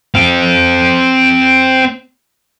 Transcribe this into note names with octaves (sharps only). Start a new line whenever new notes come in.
C4 F5